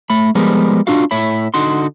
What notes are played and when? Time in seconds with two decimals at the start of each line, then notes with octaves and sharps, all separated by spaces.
0.10 A3 B5
0.35 F3 G3 G#3 B3 A#4
0.87 D4 F4 F#4 F5
1.11 A2 C#5 E5 B5
1.54 D3 D#4 F#4 C6